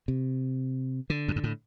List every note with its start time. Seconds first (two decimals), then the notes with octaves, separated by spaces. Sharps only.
0.08 C3
1.10 D3
1.28 F2
1.36 G2
1.44 A2